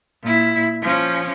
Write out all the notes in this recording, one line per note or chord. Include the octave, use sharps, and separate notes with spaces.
A#2 E4
F3 C#4